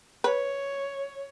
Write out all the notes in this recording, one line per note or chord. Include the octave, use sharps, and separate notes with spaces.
B4 C#5